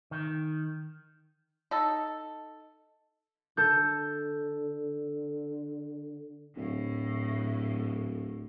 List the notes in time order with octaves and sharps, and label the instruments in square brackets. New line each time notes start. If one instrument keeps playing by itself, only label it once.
[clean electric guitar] D#3
[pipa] D#4 A4
[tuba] D3 [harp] A4 G6
[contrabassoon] D1 [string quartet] A2